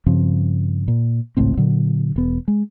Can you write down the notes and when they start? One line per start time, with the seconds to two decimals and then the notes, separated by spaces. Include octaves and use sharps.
0.06 G2 C#3 F3 C4
0.88 A#2
1.37 G#1 C#2 A2 C4
1.57 A#2 D3 F#3
2.16 E1 B3
2.48 G#3